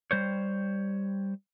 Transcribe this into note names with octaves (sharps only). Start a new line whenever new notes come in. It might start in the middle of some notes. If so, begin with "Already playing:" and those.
G3 C5 C#5